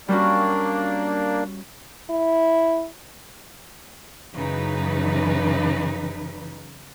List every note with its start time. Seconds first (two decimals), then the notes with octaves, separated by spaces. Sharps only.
0.08 G3 A#3 C#4 D4 F#4
2.10 E4
4.35 F#2 C#3 E3 D#4 B4